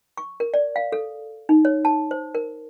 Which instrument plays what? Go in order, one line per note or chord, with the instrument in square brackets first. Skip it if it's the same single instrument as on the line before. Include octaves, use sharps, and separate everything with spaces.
[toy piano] C#6
A#4
D5
F5
A4
D#4
C#5
A5
C5
A#4